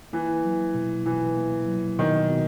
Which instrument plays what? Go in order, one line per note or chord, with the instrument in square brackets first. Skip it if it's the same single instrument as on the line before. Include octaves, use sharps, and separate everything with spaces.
[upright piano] E3 [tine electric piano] A#3
[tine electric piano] F#3
B2
[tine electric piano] B2 [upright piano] E3
[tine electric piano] A#3
F#3
[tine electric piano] B2 [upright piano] D#3
[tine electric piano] B2